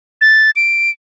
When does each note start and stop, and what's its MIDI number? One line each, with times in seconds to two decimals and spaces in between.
0.21 0.51 93
0.56 0.90 98